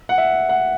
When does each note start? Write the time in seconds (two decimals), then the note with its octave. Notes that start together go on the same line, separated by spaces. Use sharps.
0.09 F#5
0.18 E5
0.49 F#5